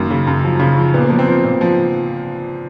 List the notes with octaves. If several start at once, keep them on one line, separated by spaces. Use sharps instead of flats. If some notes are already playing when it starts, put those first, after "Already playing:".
Already playing: F#2 D#3 A#3
C#3
F#2
F3
C#3
F3
A#2 B3
A#3
F3 B3
C4
F3
A#2
F3